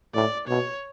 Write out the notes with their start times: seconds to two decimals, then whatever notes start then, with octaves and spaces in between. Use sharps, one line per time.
0.15 A2 D5
0.48 B2 C#5